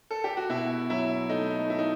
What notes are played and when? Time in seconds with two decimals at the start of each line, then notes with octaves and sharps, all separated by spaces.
0.11 A4
0.24 G4
0.37 F#4
0.49 B2 E4
0.90 F#3 E4
1.29 A3 D#4
1.70 E4
1.79 D#4